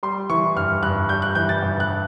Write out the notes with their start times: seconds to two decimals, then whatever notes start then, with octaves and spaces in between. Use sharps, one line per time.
0.03 G3 C6
0.30 E3 C#6
0.56 G2 F6
0.82 G2 F#6
1.09 G3 G6
1.22 F#6
1.35 E3 G6
1.49 A6
1.62 G2
1.80 F#6